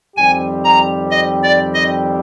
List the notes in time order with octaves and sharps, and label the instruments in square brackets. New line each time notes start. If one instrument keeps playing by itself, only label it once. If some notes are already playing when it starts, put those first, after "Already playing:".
[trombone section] F2 D#3 G3 C4 G4 [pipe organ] G#5
[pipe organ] A#5
D#5
D5
D#5